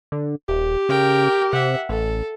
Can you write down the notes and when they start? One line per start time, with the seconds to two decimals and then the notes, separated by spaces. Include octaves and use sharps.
0.12 D3
0.49 D#1 G4
0.89 C#3 A#4 G5
1.53 C3 E5 F#5
1.89 A1 A4